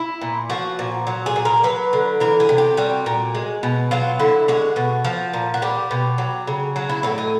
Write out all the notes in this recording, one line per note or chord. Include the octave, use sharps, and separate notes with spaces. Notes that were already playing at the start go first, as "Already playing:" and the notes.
Already playing: E4
A#2
F3 F#4
A#2
F#3
G#4
A#2
A#4
F#3 B4
D3
E3 A#4
G#4
C3
G4
G3 F#4
A#2
G#3
B2
F#3 F4
D3 E4
G#3 F#4
B2
F3
A#2
F#4
G3 G4
B2
F#3
C#3
F#3 F#4
E4
A2 E4
D#4